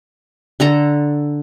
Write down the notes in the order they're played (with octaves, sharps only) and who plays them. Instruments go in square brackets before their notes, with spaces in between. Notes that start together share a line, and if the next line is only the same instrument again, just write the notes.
[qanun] D3 A4 A#5